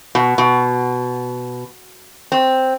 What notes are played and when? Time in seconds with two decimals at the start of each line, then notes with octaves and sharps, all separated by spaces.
0.15 B2
0.38 B2
2.32 C4